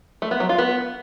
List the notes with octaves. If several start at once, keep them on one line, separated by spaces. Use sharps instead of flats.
A3
B3
F#3
F4
B3